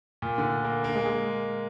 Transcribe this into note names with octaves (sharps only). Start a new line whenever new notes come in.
A#2
D3
A#3
A#3
G#3
G#3